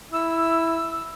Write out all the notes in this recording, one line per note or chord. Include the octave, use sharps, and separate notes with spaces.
E4 E6